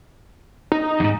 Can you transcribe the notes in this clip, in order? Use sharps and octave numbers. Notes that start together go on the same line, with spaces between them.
D#4
E2 G#2